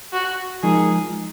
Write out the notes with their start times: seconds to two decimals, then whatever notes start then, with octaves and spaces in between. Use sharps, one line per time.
0.13 F#4
0.63 F3 G#3 D#4 G#4 A#4